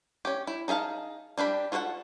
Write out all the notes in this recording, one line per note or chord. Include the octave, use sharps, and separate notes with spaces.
C#4 G4
E4
D#4 G#4 E5 F5 A5
G3 D4 G4 B5
F4 F#4 A4 C5 F#5